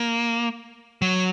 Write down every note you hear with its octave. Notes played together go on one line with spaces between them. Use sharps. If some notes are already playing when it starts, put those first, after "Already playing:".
Already playing: A#3
F#3